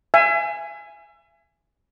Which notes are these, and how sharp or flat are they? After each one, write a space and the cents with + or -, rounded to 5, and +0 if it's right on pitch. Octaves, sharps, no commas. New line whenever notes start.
E5 +35 G#5 +0